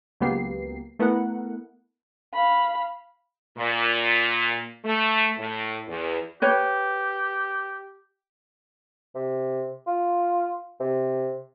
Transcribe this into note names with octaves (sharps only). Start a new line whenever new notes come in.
C#2 F#3 A#3 B3 G4 C7
A3 B3 E4 A#4 F#5
F5 B5
A#2
A3
A2
E2
G4 B4 C#5 G5
C3
F4
C3